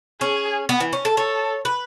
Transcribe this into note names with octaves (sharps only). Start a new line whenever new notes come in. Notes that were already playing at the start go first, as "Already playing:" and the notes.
C#4 G#4
B3
E3
C#4
A4
A4 C#5
B4